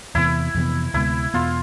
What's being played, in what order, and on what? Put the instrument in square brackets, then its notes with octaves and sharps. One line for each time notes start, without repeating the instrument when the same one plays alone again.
[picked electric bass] E2 C3 E3 B3 [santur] E4
[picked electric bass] F2 C3 E3 B3
[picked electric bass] D2 C3 G#3 B3 [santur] E4
[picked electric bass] E2 B2 B3 [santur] F4